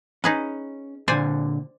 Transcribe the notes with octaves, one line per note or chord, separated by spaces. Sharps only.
C#4 D#4 G#4 B4
A#2 D3 C5 D5 G#5